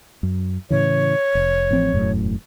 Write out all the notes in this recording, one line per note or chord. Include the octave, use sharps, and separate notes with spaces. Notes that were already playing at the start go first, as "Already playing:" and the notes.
F#2
A2 C#3 E3 C#5
F1
A1 F3 C4
E1 F#2 A2